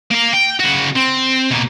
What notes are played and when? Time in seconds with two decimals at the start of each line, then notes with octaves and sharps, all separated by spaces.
0.11 A#3 A#4
0.33 G5
0.59 C#3 F#4
0.96 C4
1.50 B2 A#3